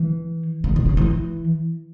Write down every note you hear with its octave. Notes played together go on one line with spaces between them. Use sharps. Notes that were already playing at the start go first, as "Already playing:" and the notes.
Already playing: E3
C#3
B2
C#3
E3